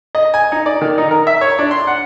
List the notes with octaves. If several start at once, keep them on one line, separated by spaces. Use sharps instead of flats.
D#5
G#5
D#4
D5
D#3
D#4
A#4
E5
C#5
D4
C6
F#5